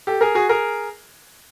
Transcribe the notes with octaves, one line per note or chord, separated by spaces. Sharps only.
G4 A4
G#4 A#4
F#4 G#4
G#4 A#4